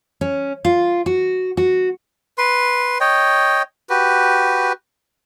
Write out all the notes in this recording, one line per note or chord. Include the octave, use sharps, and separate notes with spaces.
C#4
F4
F#4
F#4
B4 C6
C#5 D#5 G5
F#4 G4 B4